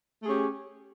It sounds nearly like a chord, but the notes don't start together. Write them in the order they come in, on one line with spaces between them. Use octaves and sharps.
A3 G#4 C#4 G4